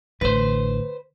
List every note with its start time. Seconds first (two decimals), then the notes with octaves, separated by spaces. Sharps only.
0.21 A1 D3 B4 C5